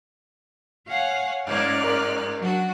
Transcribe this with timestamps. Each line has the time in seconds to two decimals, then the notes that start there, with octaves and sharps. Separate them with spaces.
0.89 C#5 F5 F#5 G#5
1.47 G2 G#3 A#3 C#4 D5 F6 F#6
1.84 A#4
2.40 F#3 D4 F#4